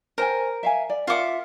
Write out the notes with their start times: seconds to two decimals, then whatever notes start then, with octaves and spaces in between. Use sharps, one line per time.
0.18 A#4 C5 G5 G#5
0.63 E5 F5 G#5
0.90 D5
1.07 F4 A#4 E5 F#5 D6